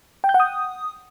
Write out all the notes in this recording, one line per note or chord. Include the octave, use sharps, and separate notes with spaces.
G5
G6
F#5
D#6